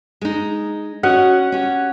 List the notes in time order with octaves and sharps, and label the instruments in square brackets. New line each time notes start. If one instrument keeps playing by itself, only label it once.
[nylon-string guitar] G#3 D#4
[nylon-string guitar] C#4 F#4 D#5 [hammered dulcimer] F#5
[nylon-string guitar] C#4 G4